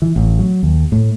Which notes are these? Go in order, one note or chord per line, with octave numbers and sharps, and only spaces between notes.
E3
A1
F#3
D#2
A2